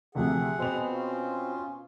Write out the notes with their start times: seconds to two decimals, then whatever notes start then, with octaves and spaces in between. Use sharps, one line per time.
0.15 D2 C3 F3 G#4 F#5
0.58 B2 B3 C4 F7
0.89 C#4 F4